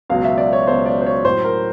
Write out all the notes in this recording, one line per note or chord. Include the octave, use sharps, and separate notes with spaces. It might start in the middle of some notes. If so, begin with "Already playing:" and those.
C#2 B2 F#3 F5
E5
D5
C#5
C#2 B2 F#3 C5
D5
C5
C#5
A2 F#3 C5
A#4